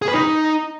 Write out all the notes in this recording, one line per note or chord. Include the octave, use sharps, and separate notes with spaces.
G#4
B4
D#4